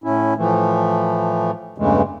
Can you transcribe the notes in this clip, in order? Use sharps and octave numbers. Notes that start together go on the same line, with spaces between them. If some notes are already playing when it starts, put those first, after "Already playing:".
A2 C#4 E4
A2 E3 F3 A3
E2 G2 C#3 E3 G#3 A3